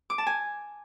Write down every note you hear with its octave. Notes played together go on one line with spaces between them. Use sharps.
D6
A5
G#5